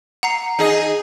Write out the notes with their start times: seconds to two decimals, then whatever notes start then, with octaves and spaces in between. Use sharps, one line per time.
0.23 F#5 A#5 C7
0.59 D#4 G#4 D#5